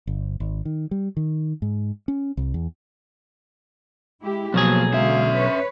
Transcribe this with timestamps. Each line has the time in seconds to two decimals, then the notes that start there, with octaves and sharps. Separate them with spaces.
0.07 G1
0.40 G#1
0.65 D#3
0.91 G3
1.17 D#3
1.62 G#2
2.08 C#4
2.37 C2
2.54 E2
4.22 G#3 E4 G4
4.54 B1 B2 F3 F#3 A#3 G#4
4.93 D3 G#3 C#4 E5 F5
5.33 B4 C#5